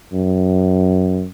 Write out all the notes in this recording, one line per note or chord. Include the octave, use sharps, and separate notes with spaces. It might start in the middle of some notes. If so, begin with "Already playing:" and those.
F#2